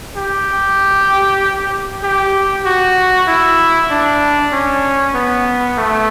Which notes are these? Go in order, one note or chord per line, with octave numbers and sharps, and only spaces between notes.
G4
G4
F#4
E4
D4
C#4
B3
A3